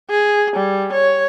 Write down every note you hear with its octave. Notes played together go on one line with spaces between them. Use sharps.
G#4
G3
C#5